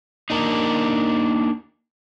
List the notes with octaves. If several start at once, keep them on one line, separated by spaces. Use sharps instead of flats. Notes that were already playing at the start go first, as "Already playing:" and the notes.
A#3 D4 D#4